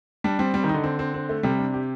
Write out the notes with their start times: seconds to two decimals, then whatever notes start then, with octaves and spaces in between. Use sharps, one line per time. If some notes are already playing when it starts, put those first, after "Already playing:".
0.24 G3 D4
0.39 G3 C4
0.54 G3 C4
0.64 D#3
0.69 D3 D#4
0.84 C4
0.99 C4
1.14 C4
1.29 A3
1.43 C3 G3
1.59 D4
1.74 G4